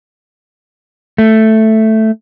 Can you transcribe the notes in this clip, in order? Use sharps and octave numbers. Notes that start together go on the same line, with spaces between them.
A3